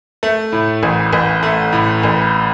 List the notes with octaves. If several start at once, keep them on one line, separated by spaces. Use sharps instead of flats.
A3
A2
A1
A1
A3
A2
A1